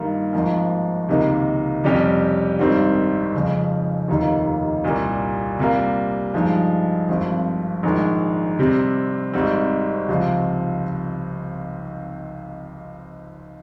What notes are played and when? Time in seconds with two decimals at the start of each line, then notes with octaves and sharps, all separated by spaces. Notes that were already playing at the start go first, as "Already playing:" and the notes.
Already playing: G2 D#3 A#3 F4
0.33 G#1 G#2 F3 A#3
1.09 C#2 C3 D#3 A#3
1.84 F2 C3 G3 C#4 G4
2.59 G#1 G2 D#3 G3 C4
3.34 F2 C#3 F3 G#3 C#4
4.08 F1 D#2 D#3 A#3 F4
4.84 C2 A#2 G3 A#3
5.58 C3 G3 A#3 F4
6.34 G2 F3 G#3 D#4
7.09 G#1 G2 F3 C4
7.83 A#1 G#2 D#3 G#3
8.59 C3 G3 C4
9.33 G#1 G#2 G3 C4
10.08 C#2 C3 F3 C4 F4